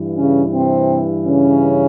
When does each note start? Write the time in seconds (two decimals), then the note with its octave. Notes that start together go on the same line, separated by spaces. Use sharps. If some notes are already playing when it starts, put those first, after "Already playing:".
Already playing: G2 E3
0.17 C#3 C#4
0.53 C3 C4
1.26 C#3 C#4